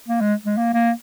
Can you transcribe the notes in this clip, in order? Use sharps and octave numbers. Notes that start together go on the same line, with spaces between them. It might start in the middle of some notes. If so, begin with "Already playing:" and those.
A#3
G#3
G#3
A#3
A#3